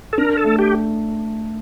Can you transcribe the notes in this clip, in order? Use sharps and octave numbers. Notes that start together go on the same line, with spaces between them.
A4
D4 A#4
A4
A3
G4